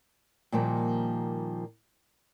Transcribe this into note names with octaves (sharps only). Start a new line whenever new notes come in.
A#2 D#3 F3 G3 A#3